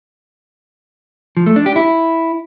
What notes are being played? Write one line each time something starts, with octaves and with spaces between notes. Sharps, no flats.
F3
A3
D4
G4
E4